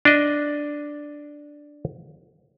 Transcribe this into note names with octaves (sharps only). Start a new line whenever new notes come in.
D4 D#5